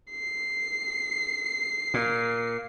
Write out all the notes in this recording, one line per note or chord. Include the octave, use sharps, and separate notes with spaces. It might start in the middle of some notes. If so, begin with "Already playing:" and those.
C7
A#2